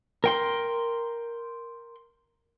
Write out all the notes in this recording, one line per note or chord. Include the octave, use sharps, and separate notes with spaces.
A#4 G5 C6